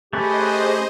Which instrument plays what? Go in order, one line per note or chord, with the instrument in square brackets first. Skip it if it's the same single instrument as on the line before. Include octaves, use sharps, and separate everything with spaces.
[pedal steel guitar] A3 C#4 B4 [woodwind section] G4 [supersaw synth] G#4 C5 D#5